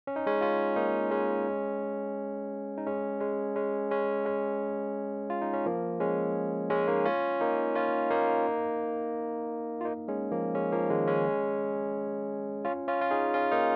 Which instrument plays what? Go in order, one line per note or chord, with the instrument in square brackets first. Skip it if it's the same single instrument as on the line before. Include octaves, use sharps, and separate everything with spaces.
[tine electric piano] C#4
D#4
G#3 C#4
C#4 F4
A#3 D#4
G#3 C#4
D#4
G#3 C#4
G#3 C#4
G#3 C#4
G#3 C#4
G#3 C#4
F4
D#4
C#4
F3 A#3
G#3 C#4
G#3 C#4
A#3 D#4
C#4 F4
A#3 D#4
C#4 F4
A#3 D#4
F4
A#3 D#4
G#3 C#4
F3 A#3
G#3 C#4
F3 A#3
D#3 G#3
G#3 C#4
C#4 F4
C#4 F4
F4
D#4 G#4
C#4 F4
A#3 D#4